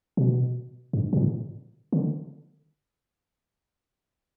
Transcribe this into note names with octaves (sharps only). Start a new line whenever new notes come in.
B2
G2
B2
A2
D3